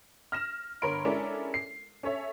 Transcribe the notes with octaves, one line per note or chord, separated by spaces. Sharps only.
F6 A#6 E7
G1 A#4 C#5 B5 C6 D7
G#3 C#4 D4 E4 A4 A#4
C7
C#4 A4 C#5 E5